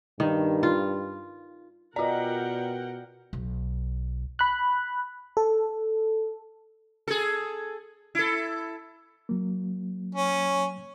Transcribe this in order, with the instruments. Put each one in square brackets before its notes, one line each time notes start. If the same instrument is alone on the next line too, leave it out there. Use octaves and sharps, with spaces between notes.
[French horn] G2 [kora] D#3
[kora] F4
[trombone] B2 [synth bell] F4 D5 [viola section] A#4 F#5 G5 [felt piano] D#5 A#5
[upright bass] B1
[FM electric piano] B5 F#6
A4
[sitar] G#4 A4
E4 A4
[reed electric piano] F#3 A#3
[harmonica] C#4